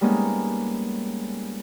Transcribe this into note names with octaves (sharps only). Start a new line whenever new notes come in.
G3 G#3 A#3 B3 C#4 D#4